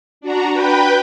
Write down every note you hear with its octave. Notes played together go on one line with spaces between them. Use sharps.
D4 F#4 A#5
B4 G5 B5